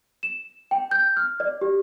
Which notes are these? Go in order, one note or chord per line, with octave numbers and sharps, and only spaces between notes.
E7
G5
G6
F6
D5
G4